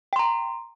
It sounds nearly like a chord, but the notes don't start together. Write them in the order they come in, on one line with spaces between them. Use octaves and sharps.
G5 C6 A#5